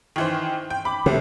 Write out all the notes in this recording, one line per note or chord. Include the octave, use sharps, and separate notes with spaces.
D#3 E3 C5
G5
B5 D6
C2 C3 A3